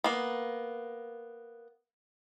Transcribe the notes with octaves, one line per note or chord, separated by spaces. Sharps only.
A#3 B3